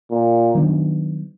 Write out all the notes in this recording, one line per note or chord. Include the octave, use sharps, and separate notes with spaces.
A#2
D#3 F#3 B3 D4